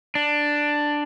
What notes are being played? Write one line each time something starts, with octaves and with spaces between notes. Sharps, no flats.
D4